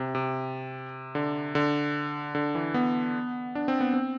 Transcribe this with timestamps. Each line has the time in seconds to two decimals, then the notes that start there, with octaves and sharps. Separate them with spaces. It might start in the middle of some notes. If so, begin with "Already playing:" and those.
Already playing: C3
0.15 C3
1.15 D3
1.55 D3
2.35 D3
2.55 E3
2.74 B3
3.55 D4
3.68 C4
3.80 B3
3.94 C4